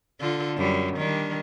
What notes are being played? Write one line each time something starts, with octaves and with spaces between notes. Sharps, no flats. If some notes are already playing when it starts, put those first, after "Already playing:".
D3 F4 A4
F#2 G3
D#3 G3 D4